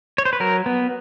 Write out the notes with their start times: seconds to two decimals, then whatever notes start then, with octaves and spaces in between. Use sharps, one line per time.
0.18 C#5
0.25 C5
0.33 B4
0.40 F#3 A#4
0.66 B3